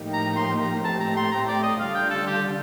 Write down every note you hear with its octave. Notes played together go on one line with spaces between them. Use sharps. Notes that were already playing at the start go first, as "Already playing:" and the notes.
Already playing: A2 F3 A#3 D#4 G4
A#5
C6
A#5
A2 A3 C4 G4 A5
A#5
C6
A#5
D5
D#5
D3 G3 D4 F4 F5
G5
A4
G4